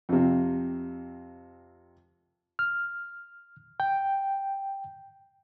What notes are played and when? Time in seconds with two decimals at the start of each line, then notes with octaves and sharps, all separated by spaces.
0.09 F2 C3
2.59 F6
3.80 G5